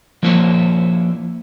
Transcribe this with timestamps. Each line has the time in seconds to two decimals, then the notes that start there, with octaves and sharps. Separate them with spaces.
0.23 F3 A#3 E4 C5 C#5